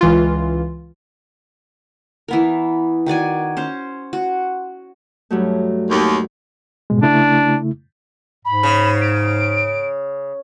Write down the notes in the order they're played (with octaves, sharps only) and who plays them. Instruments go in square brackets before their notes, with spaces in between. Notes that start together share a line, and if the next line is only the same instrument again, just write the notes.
[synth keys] C#2 E3 F4
[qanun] E3 B3 A#4
D#3 F#4 D5 G#5
C#4 C5
F#4
[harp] G2 F#3 A3
[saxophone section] D#2
[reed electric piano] G#2 B2 G#3
[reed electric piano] C#3 A3 E4 [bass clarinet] D4
[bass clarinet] G#2 [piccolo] B5
[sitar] C#3
[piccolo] D7